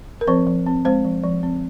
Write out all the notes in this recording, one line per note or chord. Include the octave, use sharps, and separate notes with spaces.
A#4
F3 C4 C5
F3
C4
G#3 C4 C5
F3
F3
C4